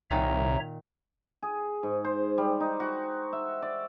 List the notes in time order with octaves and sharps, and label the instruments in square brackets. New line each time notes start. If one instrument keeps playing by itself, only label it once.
[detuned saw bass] C2 [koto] A#2 D#3 [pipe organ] C#5 E5 A#5
[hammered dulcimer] G#4
G#2
C5
G3
D#4
F#4
E5
D5